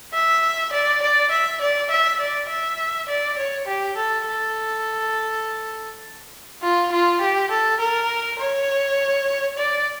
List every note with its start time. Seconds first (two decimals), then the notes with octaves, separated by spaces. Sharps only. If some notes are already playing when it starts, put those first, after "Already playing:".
0.14 E5
0.73 D5
1.02 D5
1.31 E5
1.61 D5
1.90 E5
2.20 D5
2.49 E5
3.08 D5
3.38 C#5
3.67 G4
3.97 A4
4.27 A4
6.62 F4
6.92 F4
7.21 G4
7.51 A4
7.80 A#4
8.39 C#5
9.57 D5